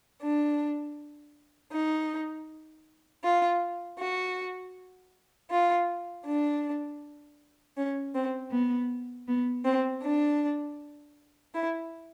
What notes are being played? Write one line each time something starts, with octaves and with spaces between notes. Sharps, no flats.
D4
D#4
F4
F#4
F4
D4
C#4
C4
B3
B3
C4
D4
E4